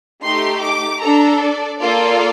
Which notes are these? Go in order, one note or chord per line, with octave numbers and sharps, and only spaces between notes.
A3 D#4 G4 C6
D6
D4 A4 A#5
D5
A#3 F4 A4 D5